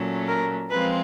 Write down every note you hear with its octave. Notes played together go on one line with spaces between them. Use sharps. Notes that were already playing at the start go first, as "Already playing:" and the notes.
Already playing: A#2 F#3 A3 C#4
A#4
F3 G#3 C4 F4 B4